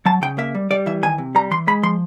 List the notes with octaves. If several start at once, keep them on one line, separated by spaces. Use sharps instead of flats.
F#3 A5
C#3 G5
A#3 E5
G3
G3 D5
E3 E5
D#3 G#5
C3
G3 A#5
E3 C6
G#3 B5
F3 C6